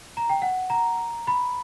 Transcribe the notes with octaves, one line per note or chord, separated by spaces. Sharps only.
A#5
G5
F#5
A#5
B5